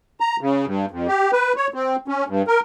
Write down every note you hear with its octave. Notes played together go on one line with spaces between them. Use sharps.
A#5
C#3
G2
F2
G4
B4
C#5
C4
C#4
G2
A#4